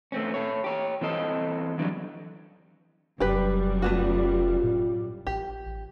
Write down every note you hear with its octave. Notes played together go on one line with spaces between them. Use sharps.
A3 C4 C#4
A4 C#5
G4 C#5
E3 C4 A4 D#5
E2 D3 D#3 F#3 G3
F1 F#2 G3 G4 B4
A3 B3 F4 F#4
A2
A1 G4